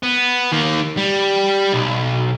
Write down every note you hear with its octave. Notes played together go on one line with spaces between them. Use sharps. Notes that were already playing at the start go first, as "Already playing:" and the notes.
B3
D#3 A#3
G3
B1